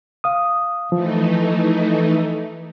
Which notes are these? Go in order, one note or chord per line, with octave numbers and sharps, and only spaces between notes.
F5 D#6
E3 F3 A3 D#4